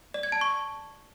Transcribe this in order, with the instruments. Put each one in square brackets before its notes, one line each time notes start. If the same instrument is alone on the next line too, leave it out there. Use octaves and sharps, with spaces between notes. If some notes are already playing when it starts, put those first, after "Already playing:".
[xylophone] D5
G#6
A5
C#6